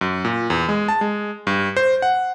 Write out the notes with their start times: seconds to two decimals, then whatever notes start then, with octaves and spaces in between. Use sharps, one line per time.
0.01 F#2
0.25 A#2
0.50 E2
0.69 G#3
0.88 A5
1.01 G#3
1.47 G2
1.77 C5
2.02 F#5